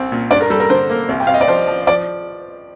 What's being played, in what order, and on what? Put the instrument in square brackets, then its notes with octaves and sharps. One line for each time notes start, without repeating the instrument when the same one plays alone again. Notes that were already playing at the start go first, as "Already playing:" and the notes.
Already playing: [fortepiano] C2 C4
A#2
[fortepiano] G2 [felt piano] D5
[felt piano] A#4
[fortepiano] G3 [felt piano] A4
[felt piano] A#4
[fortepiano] D3 [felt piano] C5
[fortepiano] A#3
C2
[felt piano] G5
[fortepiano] C2 [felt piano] F5
[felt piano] D#5
D5
[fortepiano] F3 [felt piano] C5
[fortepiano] F3
[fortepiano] F3 [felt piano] D5